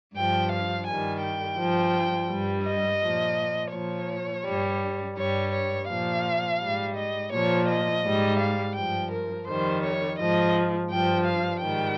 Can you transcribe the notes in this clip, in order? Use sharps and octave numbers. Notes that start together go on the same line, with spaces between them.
G2 F3 G5
F5
G2 D#3 G3 G#5
G5
G2 F3
G2 G3
D#5
A#2 F3
A#2 F3 C#5
G2 G3
G2 G3 C#5
C#5
A#2 F3 F5
G#2 G3
D#5
A#2 F3 C#5
D#5
G#2 G3
F5
G2 F3 G5
A#4
F2 D#3 G3 C5
C#5
G#2 F3 D#5
G2 F3 G5
F5
G#2 D#3 G3 G5